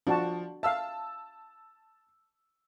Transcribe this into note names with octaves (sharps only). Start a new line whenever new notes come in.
F3 D4 F#4 A5
E5 F5 A5 E6